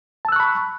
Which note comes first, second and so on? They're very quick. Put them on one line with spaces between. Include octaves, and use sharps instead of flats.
A5 E6 F#6 C#6 B5